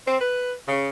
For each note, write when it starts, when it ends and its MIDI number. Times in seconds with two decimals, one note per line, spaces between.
0.07 0.18 60
0.20 0.52 71
0.68 0.89 49